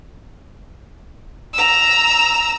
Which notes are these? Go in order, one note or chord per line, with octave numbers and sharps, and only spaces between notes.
A#5 E6